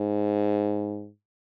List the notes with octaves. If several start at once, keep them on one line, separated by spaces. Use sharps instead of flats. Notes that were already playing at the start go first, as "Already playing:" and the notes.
Already playing: G#2